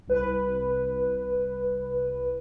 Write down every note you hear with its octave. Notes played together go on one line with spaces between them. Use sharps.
C2 B4